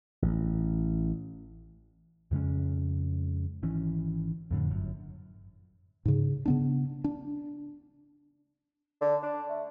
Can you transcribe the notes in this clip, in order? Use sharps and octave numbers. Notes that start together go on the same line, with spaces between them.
A1
F2 C#3 G#3 C#4
G#1 D#3 E3 C#4
F2 A2 D3
G1 F#2
G#2 C#3
C#3 B3 D4
D4
D3
D4
A3